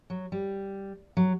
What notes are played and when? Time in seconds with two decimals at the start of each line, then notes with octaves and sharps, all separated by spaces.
0.10 F#3
0.32 G3
1.17 F#3